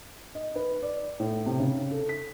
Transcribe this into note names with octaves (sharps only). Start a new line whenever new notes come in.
D#5
B4
D5
A2
C3
C#3
A4
B6